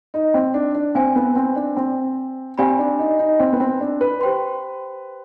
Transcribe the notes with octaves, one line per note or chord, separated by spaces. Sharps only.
D#4
C4
D4
D4
C4 C5 F5 G#5
B3
C4
D4
C4
C4 G4 D5 F5 G#5 B5
D4
D#4
D#4
C4
B3
C4
D4
B4
G4 C5 G5 C6